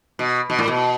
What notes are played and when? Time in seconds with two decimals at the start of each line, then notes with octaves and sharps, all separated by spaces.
0.19 B2
0.50 B2
0.59 A2
0.68 B2